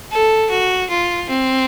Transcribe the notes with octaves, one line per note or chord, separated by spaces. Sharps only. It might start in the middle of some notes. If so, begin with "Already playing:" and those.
A4
F#4
F4
C4